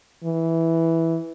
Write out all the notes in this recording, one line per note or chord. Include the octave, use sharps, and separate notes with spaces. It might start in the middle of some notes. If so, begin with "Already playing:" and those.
E3